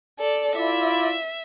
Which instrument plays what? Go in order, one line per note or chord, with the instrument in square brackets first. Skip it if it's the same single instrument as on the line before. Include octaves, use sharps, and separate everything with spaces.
[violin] A4 D5
[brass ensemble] E4 F4 D5 [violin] E5